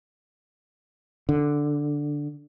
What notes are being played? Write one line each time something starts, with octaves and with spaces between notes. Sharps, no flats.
D3